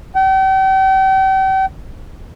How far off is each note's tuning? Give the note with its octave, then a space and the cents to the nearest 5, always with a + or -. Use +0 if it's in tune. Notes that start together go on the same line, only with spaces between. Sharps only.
G5 -40